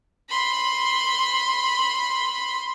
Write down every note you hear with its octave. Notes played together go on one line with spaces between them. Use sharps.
B5 C6